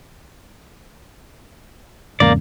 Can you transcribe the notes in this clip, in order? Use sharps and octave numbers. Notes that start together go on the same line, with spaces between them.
E2 G#2 C#3 A#3 D5